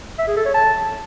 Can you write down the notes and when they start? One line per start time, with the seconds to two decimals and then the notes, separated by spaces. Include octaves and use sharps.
0.19 E5
0.28 G#4
0.37 A4
0.46 C#5
0.54 A5